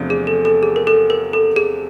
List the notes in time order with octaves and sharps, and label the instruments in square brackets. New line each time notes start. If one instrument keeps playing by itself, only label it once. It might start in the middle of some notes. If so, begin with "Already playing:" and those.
Already playing: [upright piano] E2 C3 F3 A3 D4
[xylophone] G#4
A4
A4
G#4
A#4
A4
A#4
A4
G#4